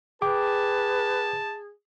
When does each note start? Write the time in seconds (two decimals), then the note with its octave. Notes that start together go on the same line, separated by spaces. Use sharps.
0.22 G#4 B4 G5 A5 D6